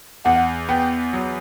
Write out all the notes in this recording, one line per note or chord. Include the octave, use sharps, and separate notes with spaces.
E2 F#5
B3 G5
F#3